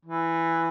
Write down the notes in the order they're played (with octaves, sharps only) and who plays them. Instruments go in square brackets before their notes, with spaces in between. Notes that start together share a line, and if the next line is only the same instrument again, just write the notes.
[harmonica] E3